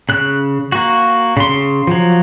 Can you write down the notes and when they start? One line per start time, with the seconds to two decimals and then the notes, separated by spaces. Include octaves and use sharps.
0.09 C#3 F#6
0.72 A#3 F#4
1.37 C#3 C6
1.87 F3 F#3